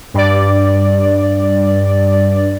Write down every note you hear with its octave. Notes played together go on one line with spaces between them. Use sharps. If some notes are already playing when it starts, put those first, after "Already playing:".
G2 D5